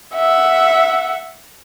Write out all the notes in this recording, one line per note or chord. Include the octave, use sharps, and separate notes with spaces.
E5 F#5